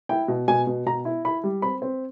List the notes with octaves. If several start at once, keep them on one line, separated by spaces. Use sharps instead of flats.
E4 G5
B2
B2 G#5
B2
B2 A#5
E4
E4 B5
G3
C4 B5
C4